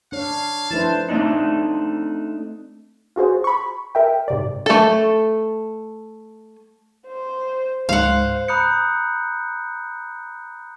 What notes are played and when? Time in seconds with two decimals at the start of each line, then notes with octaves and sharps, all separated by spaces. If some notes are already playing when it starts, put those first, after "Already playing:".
0.12 D4 C#5 F5
0.71 F3 A3 D4 E4 B4 C5 A5
1.09 A3 C4 D4 D#4
3.16 F4 F#4 G#4 C5
3.44 B5 C#6
3.95 A#4 E5 G5
4.28 G#2 C3 D5
4.66 A3 A4
7.07 C5
7.89 C#2 G#2 C5 F5 F#5
8.48 A#5 B5 D#6 F#6 G6 C#7